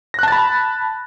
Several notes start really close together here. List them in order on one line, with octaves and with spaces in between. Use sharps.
A#6 F#6 A5 A6 B5